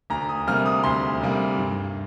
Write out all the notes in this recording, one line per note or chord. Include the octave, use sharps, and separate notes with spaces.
D2 A#5
D#6
C3 G3 A#3 F6
D#6
D2 C6
C3 G3 A#3
G2